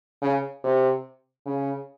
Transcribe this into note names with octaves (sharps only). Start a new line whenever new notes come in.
C#3
C3
C#3